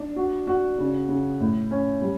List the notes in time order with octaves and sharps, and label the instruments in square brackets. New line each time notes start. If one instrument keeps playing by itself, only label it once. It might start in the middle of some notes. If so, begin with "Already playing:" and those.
Already playing: [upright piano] D4
F#4
F#4
C#3
C#3
A2
C#4
G3